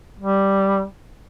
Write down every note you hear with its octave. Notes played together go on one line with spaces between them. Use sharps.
G3